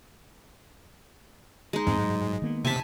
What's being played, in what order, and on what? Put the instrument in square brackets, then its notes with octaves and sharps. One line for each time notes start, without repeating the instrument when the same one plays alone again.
[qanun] G#3 D#4
[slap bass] E2 C4 [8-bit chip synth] G#2
[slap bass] F#3
D#3 A#3 B3
[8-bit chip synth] C3 B6 [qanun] G#5 A5